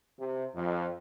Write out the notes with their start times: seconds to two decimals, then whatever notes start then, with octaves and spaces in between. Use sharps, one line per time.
0.19 C3
0.55 F2